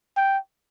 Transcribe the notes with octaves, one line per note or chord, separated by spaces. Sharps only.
G5